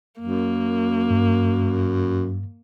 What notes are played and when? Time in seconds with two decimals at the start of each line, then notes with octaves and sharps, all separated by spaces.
0.21 F#2 A#3
1.10 G2